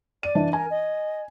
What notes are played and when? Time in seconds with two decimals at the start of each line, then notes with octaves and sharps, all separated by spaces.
0.23 D5 D#7
0.35 E3 D4
0.53 A#4 G#5
0.70 D#5